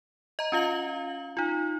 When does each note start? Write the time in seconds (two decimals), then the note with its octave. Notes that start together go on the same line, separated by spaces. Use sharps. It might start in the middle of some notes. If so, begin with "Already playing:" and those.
0.39 D#5 A#5
0.52 C#4 F4 F5 F#7
1.37 D#4 F4